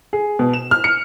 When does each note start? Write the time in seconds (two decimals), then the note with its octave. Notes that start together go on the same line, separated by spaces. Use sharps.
0.13 G#4
0.39 B2
0.53 E7
0.71 F6
0.84 C#7